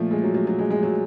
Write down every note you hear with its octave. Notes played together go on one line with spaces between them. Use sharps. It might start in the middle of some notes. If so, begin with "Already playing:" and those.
Already playing: A#2 F3 A3
G#3
F#3
F#3
F#3
G#3
G#3
F#3